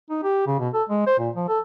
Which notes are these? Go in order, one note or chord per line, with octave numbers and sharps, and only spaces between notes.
D#4
G4
C#3
B2
A4
G#3
C5
A#2
F3
A4